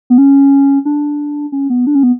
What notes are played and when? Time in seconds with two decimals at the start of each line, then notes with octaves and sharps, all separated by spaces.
0.10 B3
0.18 C#4
0.85 D4
1.52 C#4
1.70 B3
1.87 D4
1.95 C#4
2.03 B3